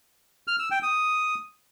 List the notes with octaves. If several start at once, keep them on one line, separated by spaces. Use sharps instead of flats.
F6
E6
G5
D#6